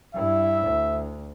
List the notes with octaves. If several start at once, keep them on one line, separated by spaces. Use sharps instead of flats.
G2 E4 E5
D2